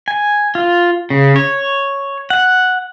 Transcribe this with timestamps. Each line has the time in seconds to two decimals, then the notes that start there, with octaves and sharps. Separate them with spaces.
0.08 G#5
0.55 F4
1.10 C#3
1.36 C#5
2.30 F#5